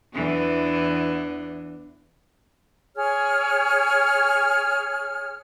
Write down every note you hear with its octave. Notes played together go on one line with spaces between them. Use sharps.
E2 E3 D4
G#4 C#5 F6